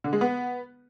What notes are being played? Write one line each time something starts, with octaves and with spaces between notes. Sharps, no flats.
D3
G#3
B3